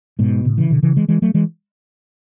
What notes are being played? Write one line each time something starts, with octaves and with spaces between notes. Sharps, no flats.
G#2 B2
A2 C#3
C#3 E3
B2 D3
C#3 E3
E3 G#3
E3 G#3
F#3 A3
E3 G#3